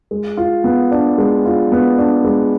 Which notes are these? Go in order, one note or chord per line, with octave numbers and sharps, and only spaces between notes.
G#3
F4
B3
D4
G#3
F4
B3
D4
G#3